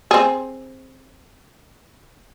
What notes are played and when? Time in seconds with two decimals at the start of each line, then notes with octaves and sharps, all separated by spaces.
0.11 C4 G#4